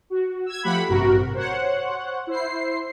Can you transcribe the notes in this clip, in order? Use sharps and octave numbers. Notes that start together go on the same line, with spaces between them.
F#4
E6 G#6
F3 A3 G4 F#5 B5
A1 G2 C3 F#4 A#4
C5 C#5 F#5
E4 C5 C7